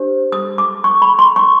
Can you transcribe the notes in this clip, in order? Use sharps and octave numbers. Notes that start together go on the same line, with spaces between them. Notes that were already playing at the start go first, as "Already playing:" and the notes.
Already playing: D4 G4 C5
D#6
D6
C#6
B5
C6
C#6